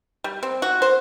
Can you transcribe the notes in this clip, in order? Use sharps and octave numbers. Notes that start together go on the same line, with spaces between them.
G3
C4
F#4
C5